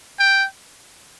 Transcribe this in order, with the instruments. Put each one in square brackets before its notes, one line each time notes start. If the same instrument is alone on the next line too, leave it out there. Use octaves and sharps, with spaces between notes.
[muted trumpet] G5